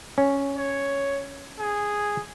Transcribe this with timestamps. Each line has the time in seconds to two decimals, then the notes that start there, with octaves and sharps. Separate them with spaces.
0.18 C#4
0.57 C#5
1.59 G#4